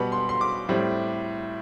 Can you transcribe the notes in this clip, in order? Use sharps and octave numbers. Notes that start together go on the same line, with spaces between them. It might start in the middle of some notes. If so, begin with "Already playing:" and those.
Already playing: B2 G3 B3 B5
C6
C6
D6
A2 G3 C4